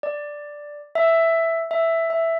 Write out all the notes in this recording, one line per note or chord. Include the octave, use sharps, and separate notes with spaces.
D5
E5
E5
E5